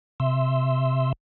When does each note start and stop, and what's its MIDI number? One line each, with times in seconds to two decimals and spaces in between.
0.20 1.12 48
0.20 1.12 76
0.20 1.12 84
0.20 1.12 88